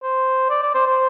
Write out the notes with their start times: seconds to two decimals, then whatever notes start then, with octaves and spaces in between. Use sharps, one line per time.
0.03 C5
0.50 D5
0.63 D5
0.75 C5
0.86 C5